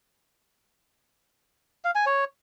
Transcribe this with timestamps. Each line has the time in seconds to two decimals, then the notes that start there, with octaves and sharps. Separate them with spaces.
1.85 F5
1.95 G#5
2.06 C#5